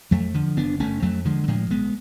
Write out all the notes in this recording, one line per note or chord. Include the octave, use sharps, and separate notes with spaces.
F2 F#3 A3
D3 F3
F#1 B3 D4
F#1 A3 C#4
F2 F#3 A3
D3 F3 G#3
F#3
A2 F3 G#3
B1 G#3 B3